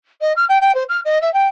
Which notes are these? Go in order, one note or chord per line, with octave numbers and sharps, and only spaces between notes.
D#5
F6
G5
G5
C5
F6
D#5
E5
G5